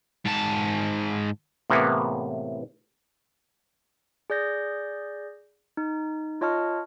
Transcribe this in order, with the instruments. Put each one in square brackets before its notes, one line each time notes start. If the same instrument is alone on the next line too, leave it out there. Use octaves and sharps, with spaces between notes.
[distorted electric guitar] G#2 A5
[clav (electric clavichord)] A2 C3 E3 A#3 B3
[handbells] G#4 D5 G6 A#6
D#4
F4 C#5 D#5 A5 C#6 F6